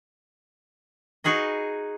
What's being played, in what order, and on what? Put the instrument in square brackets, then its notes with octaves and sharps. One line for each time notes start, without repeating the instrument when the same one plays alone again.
[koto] D#4 F#4 G#4 B4 D#5